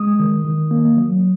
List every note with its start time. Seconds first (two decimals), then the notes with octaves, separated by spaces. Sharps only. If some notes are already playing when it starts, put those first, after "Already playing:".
Already playing: G#3 D#6
0.20 D#3
0.45 D#3
0.71 A#3
0.97 F#3